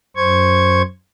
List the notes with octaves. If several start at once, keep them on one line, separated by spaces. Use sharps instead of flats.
F#2 C5 C#6 G#6